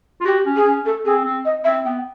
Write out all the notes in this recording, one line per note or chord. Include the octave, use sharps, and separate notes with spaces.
F4
F#4 G4
C#4
G#4
C#4
A4
C4 G#4
C4
D#5
C4 E5
B3 G5